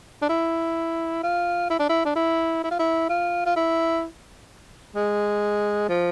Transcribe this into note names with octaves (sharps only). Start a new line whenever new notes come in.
D4
E4
F4
E4
D4
E4
D4
E4
E4
F4
E4
F4
F4
E4
G#3
F3